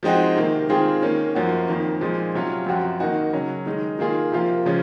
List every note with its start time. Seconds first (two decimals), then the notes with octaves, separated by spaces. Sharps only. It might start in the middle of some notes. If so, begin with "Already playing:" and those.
0.03 F3 G#3 C4 D#4 F#4
0.36 C3 D#3 A#3
0.69 D#3 G#3 C4 F4 G#4
1.02 D#3 A#3 C#4
1.35 F#2 F3 A#3 C#4 F#4
1.68 F2 D#3 A#3
2.01 A#2 F3 G#3 D#4
2.34 C3 F#3 C#4 F4
2.66 F#2 F3 C4 F#4
3.00 D#3 A#3 D#4 F#4
3.33 C#3 F#3 C#4
3.66 D#3 G#3 D#4
3.99 D#3 A#3 F4 G#4
4.32 C3 F3 A#3 F4
4.65 C#3 F3 G#3 C#4